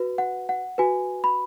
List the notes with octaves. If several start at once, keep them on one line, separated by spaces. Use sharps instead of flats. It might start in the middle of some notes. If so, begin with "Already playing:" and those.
Already playing: F#4 B4
F#5
F#5
F#4 B4 G#5
B5